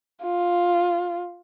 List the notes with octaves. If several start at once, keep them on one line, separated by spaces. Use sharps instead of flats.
F4